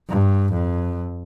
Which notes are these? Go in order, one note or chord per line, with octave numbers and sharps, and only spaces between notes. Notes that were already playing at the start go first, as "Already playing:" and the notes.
G2
F2